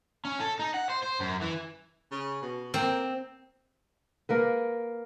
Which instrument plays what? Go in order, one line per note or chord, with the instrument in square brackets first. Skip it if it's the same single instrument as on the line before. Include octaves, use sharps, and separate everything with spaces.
[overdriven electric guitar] C#4
A4
D#4
F#5
C5
C5
F#2
E3
[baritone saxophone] C#3
B2
[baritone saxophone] A#3 [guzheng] C4
[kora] A#3 A#4 B4